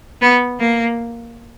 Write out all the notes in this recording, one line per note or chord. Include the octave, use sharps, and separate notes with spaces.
B3
A#3